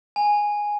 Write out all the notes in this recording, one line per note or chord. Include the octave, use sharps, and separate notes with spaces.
G#5